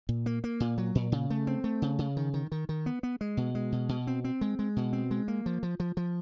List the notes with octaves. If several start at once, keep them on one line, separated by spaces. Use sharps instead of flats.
A#2
A#3
A#3
A#2
F#3
A#2
C#3
A3
C4
A3
C#3
C#3
D#3
D#3
D#3
D#3
B3
B3
G#3
B2
G#3
B2
B2
C4
C4
G#3
G#3
B2
C4
G#3
A#3
F3
F3
F3
F3